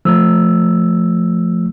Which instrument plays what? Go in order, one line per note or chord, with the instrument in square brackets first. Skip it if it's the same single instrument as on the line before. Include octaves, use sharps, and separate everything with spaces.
[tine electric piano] F3 A3 E6